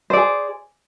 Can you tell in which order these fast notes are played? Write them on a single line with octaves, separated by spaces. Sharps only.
C5 D5 G#4